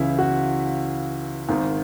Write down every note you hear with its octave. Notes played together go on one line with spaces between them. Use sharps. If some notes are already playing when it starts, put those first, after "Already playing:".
Already playing: C#2 C#3 E3 E4
F#4
G#1 G#2 D#3